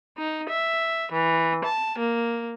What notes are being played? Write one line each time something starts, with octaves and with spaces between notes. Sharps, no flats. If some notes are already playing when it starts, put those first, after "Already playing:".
D#4
E5
E3
A5
A#3